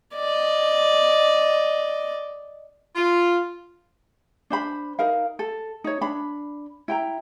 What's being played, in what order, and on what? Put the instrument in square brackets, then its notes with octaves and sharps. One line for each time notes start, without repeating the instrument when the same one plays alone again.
[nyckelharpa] D5 D#5
[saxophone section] F4
[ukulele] D4 C5 B5
D#4 A#4 F5
A4
D#4 C#5
D4 B5
E4 G5 A#5